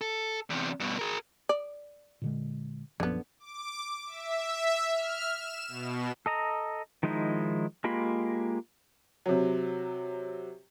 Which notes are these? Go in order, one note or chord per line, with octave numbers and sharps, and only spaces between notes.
A4
E2 C3
G2 B2
G#4 A#4
D5
A#2 D3 G#3
A#1 F#2 D3 F3 B3
D6
E5
F6
E7
B2
A4 D#5 A#5
D#3 F3 G#3 D#4 E4
G#3 A#3 F4 G4 B5
C3 F#3